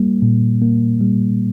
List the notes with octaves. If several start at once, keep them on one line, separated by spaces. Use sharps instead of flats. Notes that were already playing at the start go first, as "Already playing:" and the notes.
Already playing: G3 A#3
A#2
A#3
G3